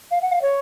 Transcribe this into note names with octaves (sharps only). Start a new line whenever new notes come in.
F5
F#5
F5
C#5